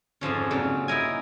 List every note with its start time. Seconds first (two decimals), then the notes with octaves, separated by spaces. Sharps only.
0.21 F2 G#2 F3 C#4
0.51 A#2 C#3 F#3
0.88 D#4 E4 A#4 G#5